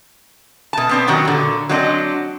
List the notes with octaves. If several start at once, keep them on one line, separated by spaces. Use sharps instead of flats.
B2 A5
B3 C4 D4
B2 D#3 F#3 F#4 G4
A#2 D3
F#3 G#3 C4 D4 D#5